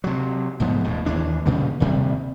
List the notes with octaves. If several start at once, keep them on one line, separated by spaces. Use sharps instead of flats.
C3 F#3
B1 G#2 F3 B3
D#1 D#2 A2
D#2 E3 D4
G2 A#2 C#3 G3
D#1 C3 G3